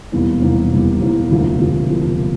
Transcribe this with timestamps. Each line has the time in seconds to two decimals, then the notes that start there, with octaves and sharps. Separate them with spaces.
0.12 E1 E2 C3 G3 A#3
0.42 E1 E2 C3 G3 A#3
0.72 E1 E2 C3 G3 A#3
1.01 E1 E2 C3 G3 A#3
1.30 E1 D2 C3 F3 A#3
1.60 E1 D2 C3 F3 A#3
1.90 C3 F3 A#3